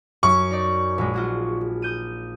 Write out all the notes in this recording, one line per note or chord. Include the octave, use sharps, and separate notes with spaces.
F#2 C#6
D#4 D5
A#1 G#3
F4 F#4 G#4
D#6 G6 D#7